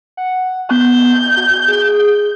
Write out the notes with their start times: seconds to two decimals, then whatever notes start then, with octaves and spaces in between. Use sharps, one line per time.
0.17 F#5
0.71 B3 G6
1.37 F#4
1.68 G#4